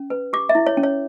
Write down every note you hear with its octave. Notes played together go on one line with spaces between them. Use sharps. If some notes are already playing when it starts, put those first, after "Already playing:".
Already playing: C#4
B4
G4 D6
E5
E4
C#5
C#4
C#5